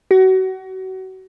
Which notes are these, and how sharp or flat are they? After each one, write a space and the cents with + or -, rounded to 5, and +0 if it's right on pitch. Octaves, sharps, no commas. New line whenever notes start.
F#4 +30